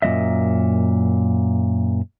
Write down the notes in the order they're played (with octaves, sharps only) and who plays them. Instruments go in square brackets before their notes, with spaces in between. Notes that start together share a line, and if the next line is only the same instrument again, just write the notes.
[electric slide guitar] F#2 A#2 G#3 D#5 E5